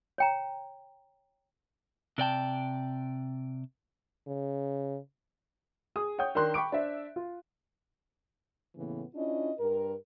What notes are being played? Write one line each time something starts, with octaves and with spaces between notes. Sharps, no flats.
C#5 G5 A#5
C3 D5 G5 A5
C#3
G#4 D#6
C#5 F#5 G5 D#6 G6
D#3 D4 A#4 C6 F#6
G5 B5 C#6 D6 D7
D4 C5 E5
F4
A2 C#3 E3 A#3 B3
C#4 D4 E4 F4 D#5
G2 G4 A#4